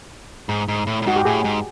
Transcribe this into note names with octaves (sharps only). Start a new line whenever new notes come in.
G#2
G#2
A2
A2
G#2 F#4
G4
A2 G#4
G#2